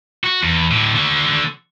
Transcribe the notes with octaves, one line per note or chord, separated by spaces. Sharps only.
F#4
E2
A2 D3
D3 F#4